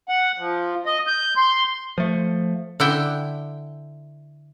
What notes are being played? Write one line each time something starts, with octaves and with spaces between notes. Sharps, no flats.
F#5
F3
D#5
G6
C6
F3 A3
D3 E4 G5